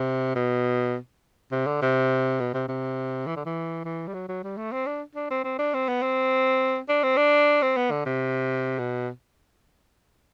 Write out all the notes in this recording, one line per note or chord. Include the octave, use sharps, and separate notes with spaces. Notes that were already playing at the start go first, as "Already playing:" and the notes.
Already playing: C3
B2
C3
D3
C3
B2
C3
C3
E3
D3
E3
E3
G3
F#3
F#3
G3
A3
C4
D4
D4
C4
C4
D4
C4
B3
C4
D4
C4
D4
C4
B3
D3
C3
B2